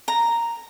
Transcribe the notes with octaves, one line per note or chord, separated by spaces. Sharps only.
A#5